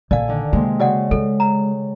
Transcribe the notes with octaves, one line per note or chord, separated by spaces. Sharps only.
A#1 A4 D5 F5 G#5
D3 D#3
C3 G#3 A#3
C#3 F#4 D5 F#5
G#3 A4
A#5